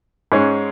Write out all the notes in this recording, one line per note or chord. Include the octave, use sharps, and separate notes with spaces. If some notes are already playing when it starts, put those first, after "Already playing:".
G#2 G#3 C#4